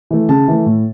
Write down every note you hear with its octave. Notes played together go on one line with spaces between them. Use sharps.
E3 A3
C#3 A5
E3 A3
A2